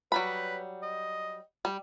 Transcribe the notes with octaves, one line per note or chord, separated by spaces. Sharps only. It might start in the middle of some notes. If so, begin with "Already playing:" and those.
F#3 G3 B4 B5
D#5
G3